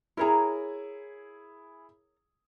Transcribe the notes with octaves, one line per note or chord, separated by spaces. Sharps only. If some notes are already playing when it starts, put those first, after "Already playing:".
E4 G#4 A#4 C#5 A#5